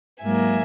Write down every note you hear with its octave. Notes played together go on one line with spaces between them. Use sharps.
G#2 F#3 A#3 E5 G#5